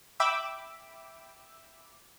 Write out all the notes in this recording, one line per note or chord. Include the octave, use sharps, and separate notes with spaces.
E5 G5 B5 D6 E6